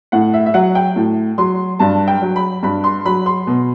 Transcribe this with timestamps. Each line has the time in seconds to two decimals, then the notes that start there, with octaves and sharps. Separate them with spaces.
0.12 A2 F#5
0.34 E5
0.46 E5
0.54 F#3 F#5
0.75 G5
0.96 A2
1.38 F#3 C6
1.79 G2 A5
2.08 G5
2.22 F#3
2.36 B5
2.63 G2 B5
2.84 C6
3.05 F#3 B5
3.26 C6
3.47 B2